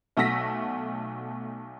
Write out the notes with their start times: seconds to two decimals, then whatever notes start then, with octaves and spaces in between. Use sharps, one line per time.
0.17 B1 A3 F#4 E6 A#6 B6